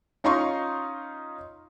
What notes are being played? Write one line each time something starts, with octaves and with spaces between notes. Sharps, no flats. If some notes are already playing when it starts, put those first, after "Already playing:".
C#4 D#4 F4 A#5 C6 C#6